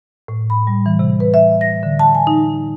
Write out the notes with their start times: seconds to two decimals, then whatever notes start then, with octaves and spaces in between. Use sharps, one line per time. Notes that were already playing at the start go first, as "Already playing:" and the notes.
0.28 A2
0.50 B5
0.67 G3
0.86 E3
0.99 C3
1.20 B4
1.34 E5
1.61 A#6
1.83 D3
1.99 A5
2.15 G#5
2.27 D#4